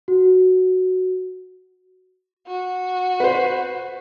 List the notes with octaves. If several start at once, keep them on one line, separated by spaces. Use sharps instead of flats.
F#4
F#4
B4 C5